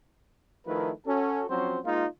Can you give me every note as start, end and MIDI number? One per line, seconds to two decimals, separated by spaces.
0.66 0.90 51
0.66 0.90 53
0.66 0.90 57
0.66 0.90 64
0.66 0.90 70
0.66 0.90 71
1.05 1.45 61
1.05 1.45 66
1.05 1.45 69
1.49 1.78 53
1.49 1.78 54
1.49 1.78 60
1.49 1.78 61
1.49 1.78 66
1.49 1.78 72
1.84 2.06 56
1.84 2.06 58
1.84 2.06 63
1.84 2.06 65